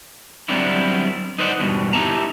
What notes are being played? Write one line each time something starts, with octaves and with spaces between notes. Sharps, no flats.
F#3 G3 B3 C4 D4 E4
D#4 B4 C5 D5 E5 F#5
E2 G2 B2
D#4 E4 G4 A5 A#5